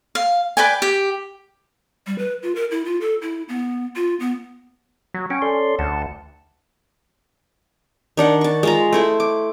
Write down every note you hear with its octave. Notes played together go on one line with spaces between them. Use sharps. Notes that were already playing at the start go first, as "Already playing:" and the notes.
F5
B4 D5 G5 G#5
G4
G3
B4
F4
A#4
E4
F4
A4
E4
B3
F4
B3
F#3
C#4 F#5 G5
A4 D5 C6
D2 F#5 A5
D#3 D4 F#5
A5 C#6
G#3 F4 A#5
A3 E4 C5
D6